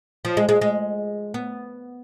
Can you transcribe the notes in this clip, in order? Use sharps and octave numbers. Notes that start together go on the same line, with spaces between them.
F3
G#3
G#3
G#3
B3